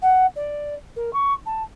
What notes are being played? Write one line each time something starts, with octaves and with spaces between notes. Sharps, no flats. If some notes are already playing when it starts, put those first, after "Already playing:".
F#5
D5
A#4
C#6
A5